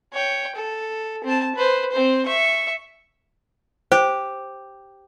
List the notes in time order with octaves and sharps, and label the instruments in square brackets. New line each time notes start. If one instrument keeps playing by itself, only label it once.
[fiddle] C#5 G5
A4
C4 A5
B4 C5
C4 C5
E5 C#6
[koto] G4 [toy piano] C5